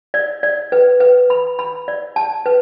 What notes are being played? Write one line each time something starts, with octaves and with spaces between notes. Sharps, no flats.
D5
D5
B4
B4
B5
B5
D5
A5
B4